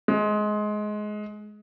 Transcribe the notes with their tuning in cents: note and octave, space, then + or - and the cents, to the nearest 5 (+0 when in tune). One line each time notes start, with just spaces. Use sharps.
G#3 +20